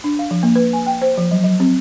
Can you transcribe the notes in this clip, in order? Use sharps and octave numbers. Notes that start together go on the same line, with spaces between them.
D4
F5
F3
A#3
B4
G#5
G5
C5
F3
F#3
F#3
C4